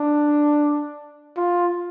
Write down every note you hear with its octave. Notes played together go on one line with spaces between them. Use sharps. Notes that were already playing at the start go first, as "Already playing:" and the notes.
Already playing: D4
F4